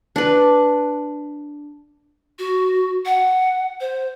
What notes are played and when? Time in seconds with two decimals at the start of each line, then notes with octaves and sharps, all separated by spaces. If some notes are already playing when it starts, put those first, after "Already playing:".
0.16 D4 B4
2.39 F#4
3.06 F#5
3.80 C5